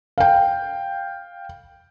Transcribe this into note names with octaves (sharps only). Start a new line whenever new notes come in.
F5 G5